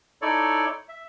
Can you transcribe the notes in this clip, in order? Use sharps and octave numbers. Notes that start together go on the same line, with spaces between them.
D#4 E4 A4 C#5 D5
E5